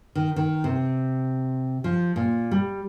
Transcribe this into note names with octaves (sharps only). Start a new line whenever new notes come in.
D#3
D#3
C3
F3
A#2
G3